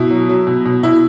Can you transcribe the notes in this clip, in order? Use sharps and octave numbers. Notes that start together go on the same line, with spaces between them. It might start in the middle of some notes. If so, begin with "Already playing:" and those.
Already playing: B2 E4
F#3
F#3
B2
B2
B2 E4